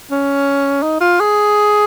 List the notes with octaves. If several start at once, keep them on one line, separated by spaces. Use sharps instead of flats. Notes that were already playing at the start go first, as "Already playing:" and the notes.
C#4
D#4
F4
G#4